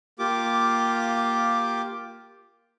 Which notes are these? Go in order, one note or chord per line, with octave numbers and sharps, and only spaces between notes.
A#3 F4 G4 D6